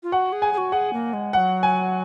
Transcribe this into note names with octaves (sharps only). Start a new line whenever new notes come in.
F4
F#4 F#5
G#4
G#5
G#4
F#4
G#4 F#5
A#3
G#3
F#3 G#3 F#5
G#5